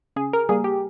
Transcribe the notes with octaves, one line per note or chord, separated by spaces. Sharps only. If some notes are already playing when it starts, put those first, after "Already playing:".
C#3 G#4
A#4
G3 A#3 G#4
G4